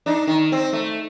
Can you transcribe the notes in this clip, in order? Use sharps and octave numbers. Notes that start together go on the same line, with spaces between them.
D4 D#4
D#3
C4
A3